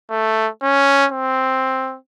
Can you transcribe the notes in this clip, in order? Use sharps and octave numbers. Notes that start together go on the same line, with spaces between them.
A3
C#4
C4